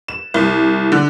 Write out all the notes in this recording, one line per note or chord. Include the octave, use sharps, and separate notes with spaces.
E7
C2
D3